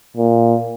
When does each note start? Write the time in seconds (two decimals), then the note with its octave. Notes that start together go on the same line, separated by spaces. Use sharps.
0.17 A#2